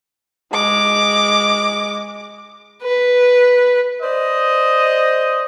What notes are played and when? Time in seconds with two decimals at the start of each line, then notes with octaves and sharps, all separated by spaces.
0.53 G#3 D6
2.83 B4
4.02 C5 D5 D#5